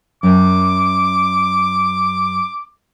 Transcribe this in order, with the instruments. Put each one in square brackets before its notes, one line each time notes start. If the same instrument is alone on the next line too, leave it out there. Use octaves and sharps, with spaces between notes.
[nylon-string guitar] F#2 [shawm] D6